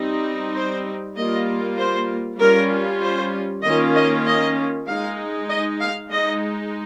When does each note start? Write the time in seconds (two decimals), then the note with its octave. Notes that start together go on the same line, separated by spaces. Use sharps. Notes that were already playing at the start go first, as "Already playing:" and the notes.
Already playing: G3 C4 D#4
0.54 C5
1.16 G3 A#3 F4 D#5
1.78 C5
2.39 G3 C#4 F4 A#4
3.02 C5
3.63 D#3 A#3 C#4 F4 D#5
3.95 D#5
4.25 D#5
4.87 G#3 D#4 F5
5.49 D#5
5.80 F5
6.11 G#3 D#4 D#5